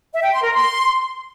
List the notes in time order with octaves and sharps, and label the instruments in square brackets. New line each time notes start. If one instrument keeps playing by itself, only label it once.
[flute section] E5
G5
C6
A#4
C6